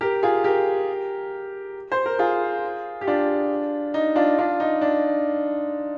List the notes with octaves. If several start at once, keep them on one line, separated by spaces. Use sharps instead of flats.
G4 A#4
F4 G#4
G4 A#4
C5
A#4
F4 G#4
G4
D4 F4
D#4
D4 F4
D4 F4
D#4
D4